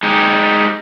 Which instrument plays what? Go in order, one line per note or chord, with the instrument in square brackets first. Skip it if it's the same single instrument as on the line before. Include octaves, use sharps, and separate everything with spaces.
[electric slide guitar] G#3 D#4 G4